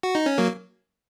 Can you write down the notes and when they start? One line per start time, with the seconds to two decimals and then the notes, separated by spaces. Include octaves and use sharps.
0.03 F#4
0.15 D#4
0.26 C#4
0.38 F#3 A#3